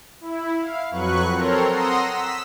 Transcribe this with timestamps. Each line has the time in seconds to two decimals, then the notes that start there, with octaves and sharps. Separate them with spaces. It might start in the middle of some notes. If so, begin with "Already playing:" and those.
0.21 E4
0.61 F5
0.90 F2 F#3 B4 C#6 F#6
1.31 C4 A4 A#4 C#5 A#5 C6
1.70 F#5 A#5 C6 D#6 E6 A#6
2.11 E6 B6